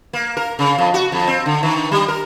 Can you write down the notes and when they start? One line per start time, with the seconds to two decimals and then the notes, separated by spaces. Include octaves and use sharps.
0.13 A#3
0.37 A#4
0.59 C#3
0.78 F2
0.94 F#4
1.12 F2
1.27 C4
1.46 D3
1.63 D#3
1.92 G3
2.08 A#4